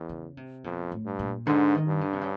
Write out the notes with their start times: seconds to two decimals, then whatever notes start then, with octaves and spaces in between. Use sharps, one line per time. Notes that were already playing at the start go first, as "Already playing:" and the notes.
Already playing: E2
0.09 C#3
0.37 C3
0.64 F2 B2
0.92 A2
1.05 G2
1.19 A#2
1.47 G#2 D3
1.75 D#3
1.87 G2
2.01 D3
2.13 C3
2.21 C#3